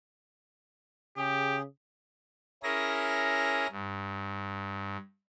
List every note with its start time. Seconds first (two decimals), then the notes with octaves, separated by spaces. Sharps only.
1.17 C#3 G4 G#4
2.63 C#4 E4 G#4 A#4 A#6
3.72 G2